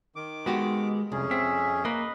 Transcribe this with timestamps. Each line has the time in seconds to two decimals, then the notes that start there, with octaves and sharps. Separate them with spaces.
0.16 D#3 D6
0.46 G#3 B3 F#4 G4
1.12 C2 F2 C#4 G#4
1.31 C4 E5
1.85 A#3 B4 D#5